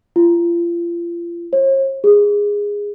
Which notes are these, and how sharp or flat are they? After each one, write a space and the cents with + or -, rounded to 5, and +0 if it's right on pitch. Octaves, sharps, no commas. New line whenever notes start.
F4 -35
C#5 -45
G#4 -15